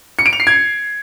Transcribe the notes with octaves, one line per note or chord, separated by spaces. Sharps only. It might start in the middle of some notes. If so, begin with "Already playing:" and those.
C#7
D7
F7
C7
G#6